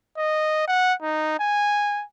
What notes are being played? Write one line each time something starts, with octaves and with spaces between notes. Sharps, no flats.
D#5
F#5
D#4
G#5